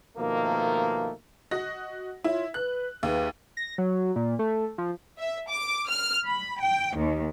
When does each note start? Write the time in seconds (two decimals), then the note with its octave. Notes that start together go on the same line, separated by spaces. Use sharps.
0.18 B2 D#3 F3 A3 A#3
1.51 F#4 D#5 A#6
2.24 E4 F4 C#5
2.54 B4 F#6
3.03 D#2 G#4 B4 E5
3.57 A#6
3.78 F#3
4.16 A#2
4.39 A3
4.78 F3
5.19 E5
5.49 D6
5.88 F6
6.27 B5
6.60 G5
6.96 D#2